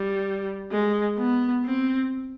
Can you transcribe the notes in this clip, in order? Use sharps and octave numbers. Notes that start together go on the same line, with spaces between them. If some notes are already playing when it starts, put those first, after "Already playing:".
Already playing: G3
G#3
B3
C4